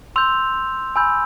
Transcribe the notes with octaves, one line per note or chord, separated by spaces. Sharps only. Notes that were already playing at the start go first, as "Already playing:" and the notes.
C6 E6 G6 F7
G#5 B5 E6 G6